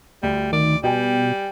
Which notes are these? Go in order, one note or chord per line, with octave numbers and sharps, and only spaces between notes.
D2 G3
D#3 D5
B2 G3 B4 G5 G#5